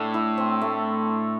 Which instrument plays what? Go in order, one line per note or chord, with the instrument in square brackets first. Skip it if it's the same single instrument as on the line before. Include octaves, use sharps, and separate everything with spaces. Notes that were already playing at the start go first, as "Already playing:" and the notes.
Already playing: [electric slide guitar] A2 [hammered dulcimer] A3 D4
[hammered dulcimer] E4
C4
A3